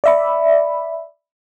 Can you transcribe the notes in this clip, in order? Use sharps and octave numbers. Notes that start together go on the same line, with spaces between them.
D5 E5 B5